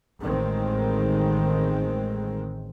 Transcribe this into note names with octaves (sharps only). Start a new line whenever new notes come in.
A1 D#3 G#3 C4